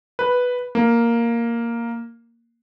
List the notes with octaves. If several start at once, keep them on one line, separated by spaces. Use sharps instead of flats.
B4
A#3